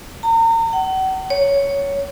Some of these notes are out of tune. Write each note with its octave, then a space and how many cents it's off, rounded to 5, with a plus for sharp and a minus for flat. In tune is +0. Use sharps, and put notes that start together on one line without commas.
A#5 -35
F#5 +40
C#5 +10